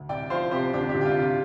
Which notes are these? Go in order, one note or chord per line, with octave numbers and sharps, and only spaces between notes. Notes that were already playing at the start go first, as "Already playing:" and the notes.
Already playing: D2
C2 D5 G5
F3 C5 F5
C3 G4 C5
D2 D4 G4
D4 G4
D2
G4
F4
C3 F4